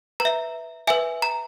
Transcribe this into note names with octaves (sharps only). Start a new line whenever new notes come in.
B4 A#5
E5
B4 E5 G#5
A#5